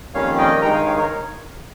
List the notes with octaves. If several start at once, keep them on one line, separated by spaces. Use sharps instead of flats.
F2 D#3 G3 A#3 C#4 C#5 F5
D#5 G5
G2 D#3 G#3 D#4 G5 A#5
F5 G#5
C#5 F5
A#4 C#5